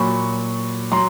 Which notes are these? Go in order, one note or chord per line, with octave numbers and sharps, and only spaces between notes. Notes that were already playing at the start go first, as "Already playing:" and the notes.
Already playing: A#2 F#3 B5 C#6
F#3 A#5 C6